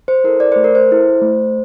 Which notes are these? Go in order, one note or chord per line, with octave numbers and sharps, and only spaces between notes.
C5
E4 A4 A#4
D5
A3 C5
A#4
C5
E4 A4
A3